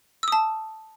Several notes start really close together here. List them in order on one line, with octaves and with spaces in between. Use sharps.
E6 D#6 A5